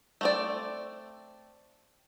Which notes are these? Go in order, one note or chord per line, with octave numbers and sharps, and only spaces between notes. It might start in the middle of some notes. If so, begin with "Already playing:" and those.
A3 C4 D5